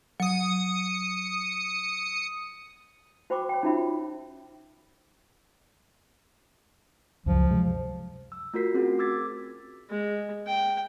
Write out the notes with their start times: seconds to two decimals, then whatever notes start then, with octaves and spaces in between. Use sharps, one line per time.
0.20 F#3 D#6 C#7
3.30 F#4 C5 G5 B5 C#6 D6
3.49 C#5 G5
3.63 C#4 D#4 F4 F#4 E5 B5
7.26 C#2 F#2 F3
7.50 C3 F#3 G#3
8.32 E6
8.54 A3 F4 F#4 A#4 B6 C7
8.74 C4 C#4 F#4 G#4
8.99 D6 E6 G#6 A6 B6
9.90 G#3
10.47 G5